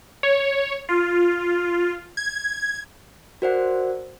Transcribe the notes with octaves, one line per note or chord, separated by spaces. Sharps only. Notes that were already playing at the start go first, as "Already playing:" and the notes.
C#5
F4
G#6
F#4 A#4 C5 D5 F#5